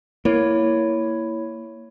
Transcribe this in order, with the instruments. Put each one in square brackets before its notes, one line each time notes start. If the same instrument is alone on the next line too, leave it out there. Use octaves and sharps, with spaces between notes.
[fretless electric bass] A#3 [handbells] E4 C#5